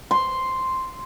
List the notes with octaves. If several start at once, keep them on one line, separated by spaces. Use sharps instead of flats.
C6